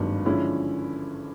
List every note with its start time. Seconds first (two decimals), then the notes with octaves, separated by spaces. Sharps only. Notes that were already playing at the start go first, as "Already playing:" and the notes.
Already playing: G#1 G2 D#3 F#3
0.25 D3 F3 G#3 C#4 E4